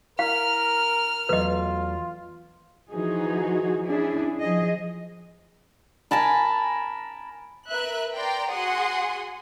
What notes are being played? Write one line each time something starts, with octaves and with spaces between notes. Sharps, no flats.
E4 A#4 F5 F6
E2 F#3 A3 F4 B4 D#5
E3 F3 D#4 F#4 G#4
C#4 D4 E4 G#4
F3 G#4 D#5
A#4 G#5 A5 B5
A#4 B4 E5 F#6
D5 G5 A#5 C6
F#4 G#4 F#5 C6 D#6